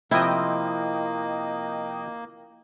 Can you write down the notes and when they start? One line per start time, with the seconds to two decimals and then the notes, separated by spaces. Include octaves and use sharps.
0.11 C3 F3 A#3 C4 E4 D#5 G5